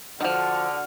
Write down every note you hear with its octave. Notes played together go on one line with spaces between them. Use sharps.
D3 D#3 F3 F#4 F6